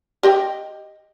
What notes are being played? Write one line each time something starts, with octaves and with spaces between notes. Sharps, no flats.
G4 D#5 G5